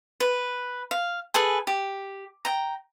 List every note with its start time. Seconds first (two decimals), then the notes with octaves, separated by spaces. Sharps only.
0.20 B4
0.91 F5
1.34 G#4 A4 B4 G#5
1.67 G4
2.45 G5 A#5